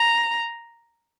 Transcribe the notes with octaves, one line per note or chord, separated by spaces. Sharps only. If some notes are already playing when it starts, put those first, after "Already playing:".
Already playing: A#5